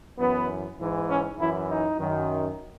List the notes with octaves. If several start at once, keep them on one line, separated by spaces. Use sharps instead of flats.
F#2 E3 B3
G#2 E3
C#4
F#2 E3 E4
D#4
F#2 D#3